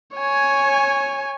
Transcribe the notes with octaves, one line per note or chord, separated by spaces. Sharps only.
C#5 G#5